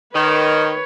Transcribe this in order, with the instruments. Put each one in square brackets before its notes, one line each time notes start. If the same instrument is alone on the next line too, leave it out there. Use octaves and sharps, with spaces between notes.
[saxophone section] D#3 [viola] B4 C#5